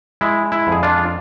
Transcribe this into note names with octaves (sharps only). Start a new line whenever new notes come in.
G#3 E4
E4
F2 G#4
D4 F4